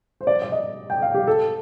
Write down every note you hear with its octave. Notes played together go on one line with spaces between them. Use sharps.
C5
D5
D5
D#5
G5
F5
G4
A4